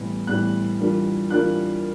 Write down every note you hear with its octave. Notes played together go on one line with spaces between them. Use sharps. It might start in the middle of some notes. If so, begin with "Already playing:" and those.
Already playing: A2 E3 G3 B3
A2 E3 G3 B3 F#6
E3 G3 A#3 D4 F4
E3 G3 A#3 D4 F4 F#6